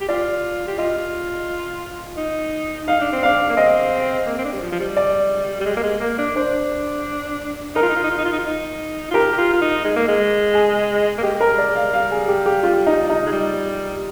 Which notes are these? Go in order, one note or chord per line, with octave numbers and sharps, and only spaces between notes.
G4
F4 D5
G4
F4 D#5
D#4
D#4 F5
D4
C4
D4 F5
A#3
C4 D#5
A#3
C4
D4
G3
F3
F3
G3
D5
G3
G#3
A#3
G#3
A#3
D4
D4 C5
D#4 A#4
F4
D#4
F4
D#4
F4
D#4
F4
D#4
F4
D#4
F4
G4 A#4
G4
F4
F4
D#4
G#3
A#3
G#3
G#4
A#3
G#3 G4
A#4
G#3
D5
G#3
F5
G3 F5
G#4
G4
G4
F4
D#4
D#4
G#3
G3